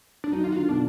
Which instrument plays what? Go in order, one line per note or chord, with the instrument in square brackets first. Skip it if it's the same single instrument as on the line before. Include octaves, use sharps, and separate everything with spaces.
[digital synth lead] D4
[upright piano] F#3 [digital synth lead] D#4
[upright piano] D#3 [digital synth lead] F4
[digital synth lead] F#4
[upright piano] D3 [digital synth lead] F4
[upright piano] B2 [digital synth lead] D4